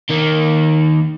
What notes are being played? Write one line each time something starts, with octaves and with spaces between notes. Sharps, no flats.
D#3 A#3